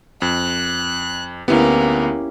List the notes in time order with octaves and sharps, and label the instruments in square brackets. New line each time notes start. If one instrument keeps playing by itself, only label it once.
[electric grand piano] F2 [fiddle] F#6
[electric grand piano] D2 B3 [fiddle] A#3 [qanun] C#4 E4 G4